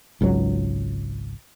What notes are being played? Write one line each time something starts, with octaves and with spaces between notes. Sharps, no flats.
G#1 C#2 G#2 F#3